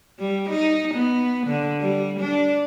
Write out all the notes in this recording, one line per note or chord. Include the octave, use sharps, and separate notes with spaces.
G3
D#4
B3
D3
G3
D4